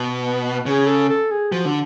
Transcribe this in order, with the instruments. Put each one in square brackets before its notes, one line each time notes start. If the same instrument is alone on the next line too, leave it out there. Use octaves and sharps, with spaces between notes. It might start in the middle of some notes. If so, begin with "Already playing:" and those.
Already playing: [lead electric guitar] B2
[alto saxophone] B4
[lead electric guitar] C#3 [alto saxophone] G#4
[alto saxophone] A4
A4
G#4
[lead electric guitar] F3 [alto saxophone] F#4
[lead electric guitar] D3